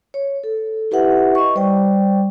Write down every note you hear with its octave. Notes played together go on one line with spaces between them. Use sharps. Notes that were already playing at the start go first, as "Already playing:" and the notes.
C#5
A4
E4 G4 B4 E5 F#5
D#5 C#6
G3 C5 D5 G5